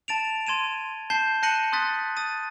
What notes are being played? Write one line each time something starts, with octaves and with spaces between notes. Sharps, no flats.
A5 A6 D7 F7
C6 G#6 D#7 E7
A5 G6 C7 G7
A5 F#6 A#6 C#7 D#7 F#7
C6 D#6 F#6 A6 B6
D#6 A6 D#7